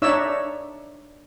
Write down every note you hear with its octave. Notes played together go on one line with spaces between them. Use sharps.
D4 D#4 C#5 D5 E5 E6